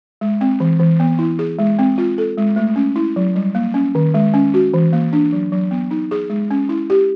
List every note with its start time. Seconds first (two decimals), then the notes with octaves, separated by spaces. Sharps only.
0.21 G#3
0.41 C4
0.60 E3
0.80 E3
1.00 B3
1.19 E4
1.39 G#4
1.59 G#3
1.79 C4
1.98 F4
2.18 A4
2.38 G#3
2.56 A3
2.76 C#4
2.96 E4
3.16 F#3
3.35 G3
3.55 A#3
3.74 C#4
3.95 D#3
4.14 G#3
4.34 C#4
4.54 F#4
4.74 E3
4.93 A#3
5.13 D4
5.33 F#3
5.52 F#3
5.71 B3
5.91 D#4
6.11 G#4
6.30 G#3
6.51 C#4
6.69 E4
6.90 G4